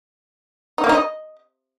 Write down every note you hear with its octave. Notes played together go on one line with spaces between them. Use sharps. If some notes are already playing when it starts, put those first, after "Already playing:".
D#4
A#3
D#4
D#5